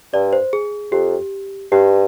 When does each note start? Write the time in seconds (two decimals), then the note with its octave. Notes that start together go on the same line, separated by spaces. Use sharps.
0.13 G2 D5
0.33 C5
0.53 G#4
0.92 F2 G4
1.71 G2 G4